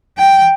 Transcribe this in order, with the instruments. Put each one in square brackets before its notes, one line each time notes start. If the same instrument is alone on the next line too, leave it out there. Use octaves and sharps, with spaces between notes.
[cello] G5